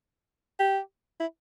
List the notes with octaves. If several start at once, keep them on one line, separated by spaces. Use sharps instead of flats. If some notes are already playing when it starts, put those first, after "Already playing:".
G4
E4